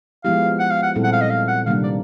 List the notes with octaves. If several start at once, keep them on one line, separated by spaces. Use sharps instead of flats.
F3 G#3 B3 E4 G4 F5
F#5
F5
F#5
A#2 G3 C4 E4 A4
F#5
F5
D#5
F5
F#5
C3 D#3 G3 A#3 D4 F5
D5